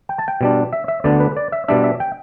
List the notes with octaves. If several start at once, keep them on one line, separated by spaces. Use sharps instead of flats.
G5
A5
G5
B2 G3 D4
E5
E5
D2 D3 B3 D4 D5
B4
D5
E5
B2 G3 D4 E5
E5
G5